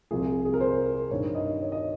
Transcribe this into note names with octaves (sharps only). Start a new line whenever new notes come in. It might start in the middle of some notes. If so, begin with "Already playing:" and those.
C2 C3 F3 G#4
G#4
A#4
C5
G2 D#3 C#5
D#5
C#5
D#5